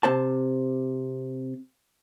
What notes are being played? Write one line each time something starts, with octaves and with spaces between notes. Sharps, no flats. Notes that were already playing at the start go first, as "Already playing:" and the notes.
C3 C5 A5